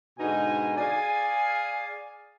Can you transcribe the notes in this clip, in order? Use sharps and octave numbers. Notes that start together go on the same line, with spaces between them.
G#2 B2 D3 D#4 G#5
G#4 D5 F5 G#5